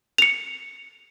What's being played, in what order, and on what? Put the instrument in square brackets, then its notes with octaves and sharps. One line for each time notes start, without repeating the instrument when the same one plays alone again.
[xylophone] C#7 F7